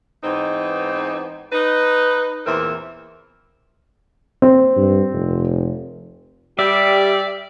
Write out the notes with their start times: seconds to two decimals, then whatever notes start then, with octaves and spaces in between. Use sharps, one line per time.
0.23 G#2 E3 B3 C4 D#4
1.52 D#4 B4
2.46 E2 A#2 E3 C4 A#4 E5
4.42 C4
4.77 G2
5.13 F1
6.59 G3 G4 D5 E5